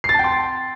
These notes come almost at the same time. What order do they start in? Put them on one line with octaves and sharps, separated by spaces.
C7 A6 A5 G5 C6